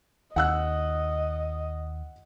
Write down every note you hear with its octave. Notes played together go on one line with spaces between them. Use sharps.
D#2 D#5 F#5 E6 F#6